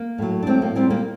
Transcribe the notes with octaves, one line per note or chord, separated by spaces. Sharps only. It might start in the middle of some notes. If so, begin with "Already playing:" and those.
Already playing: A#3
A2 F#3
D4
A2 F#3 C4
A#3
A#2 G3 C4
A#3